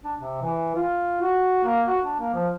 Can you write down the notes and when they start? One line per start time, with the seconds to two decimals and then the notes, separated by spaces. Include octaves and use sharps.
0.04 D4
0.19 C3
0.42 E3
0.75 F4
1.21 F#4
1.64 A#3
1.87 F#4
2.03 D4
2.20 A#3
2.34 F3